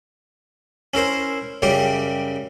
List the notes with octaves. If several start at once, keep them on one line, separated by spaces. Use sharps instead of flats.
C#4 E4 A#4 C5
F#2 C#3 G3 G4 D6